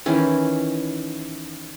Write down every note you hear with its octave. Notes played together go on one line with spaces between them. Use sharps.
D#3 E3 C#4